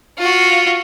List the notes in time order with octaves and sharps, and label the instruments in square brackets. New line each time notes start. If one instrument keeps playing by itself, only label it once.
[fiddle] F4 F#4